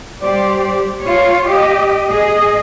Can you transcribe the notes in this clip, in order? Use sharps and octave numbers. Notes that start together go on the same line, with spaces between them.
G3 G4 C5 D5
F4 C#5
G4 D#5
G#4 D#5